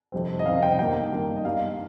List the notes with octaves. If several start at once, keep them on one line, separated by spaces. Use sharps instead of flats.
F2 C3 D#3 G3 C4
D#5
F2 C3 D#3 G3 C4 F5
G5
G2 D#3 A#3 G5
G2 D#3 A#3
D#5
G2 G3 A#3 F5